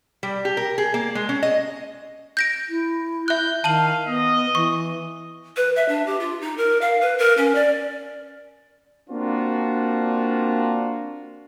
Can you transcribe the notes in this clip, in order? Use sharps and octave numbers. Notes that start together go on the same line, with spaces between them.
G3
G4
A#4
G#4
A#3
G#3
C#4
D#5
G6 A#6 D7
E4
E5 F#6 G6
D#3 F5 A5 D#7 F#7
B3 D#5
E3 C#6
B4
E5
D4
G4
F4
D#4
A#4
F5
B4
A#4
C#4
D5
A#3 C4 D4 F4 F#4